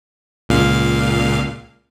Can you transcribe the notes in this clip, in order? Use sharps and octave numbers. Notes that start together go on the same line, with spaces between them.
C#2 A#2 F5